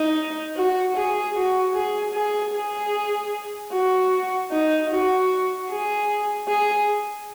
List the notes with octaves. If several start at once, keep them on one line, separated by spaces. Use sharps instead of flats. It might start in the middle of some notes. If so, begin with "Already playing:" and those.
Already playing: D#4
F#4
G#4
F#4
G#4
G#4
G#4
F#4
D#4
F#4
G#4
G#4